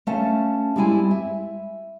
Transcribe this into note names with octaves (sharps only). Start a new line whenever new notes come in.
A3 C#4 E5 F5 A5
G3 G#3 C4 E4 G#5
E5